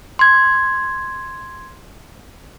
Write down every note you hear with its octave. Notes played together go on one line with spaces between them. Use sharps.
C6 G#6